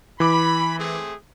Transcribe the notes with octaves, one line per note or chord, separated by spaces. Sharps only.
E3 B5 D6
A3 C4 G#4